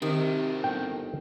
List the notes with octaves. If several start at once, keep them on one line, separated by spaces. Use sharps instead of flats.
C3 D#3 C4 D#4
G1 G5